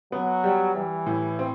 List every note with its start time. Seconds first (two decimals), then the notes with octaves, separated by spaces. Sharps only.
0.12 F#3 B3
0.44 G3
0.75 E3 G3
1.06 A2
1.39 C4